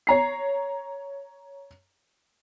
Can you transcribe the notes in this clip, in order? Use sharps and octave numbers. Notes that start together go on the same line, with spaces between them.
C#5 A#5 C7